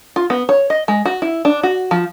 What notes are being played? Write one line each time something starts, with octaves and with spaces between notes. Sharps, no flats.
F4
B3
C#5
D#5
G#3
F#4
E4
D4
F#4
F3